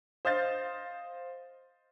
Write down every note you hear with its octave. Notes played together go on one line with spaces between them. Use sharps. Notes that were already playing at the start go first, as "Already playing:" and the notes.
C5 D#5 F5 G6 A6